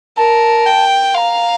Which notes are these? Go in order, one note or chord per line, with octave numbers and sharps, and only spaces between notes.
A#4 A5
G5
F5 A#5 C6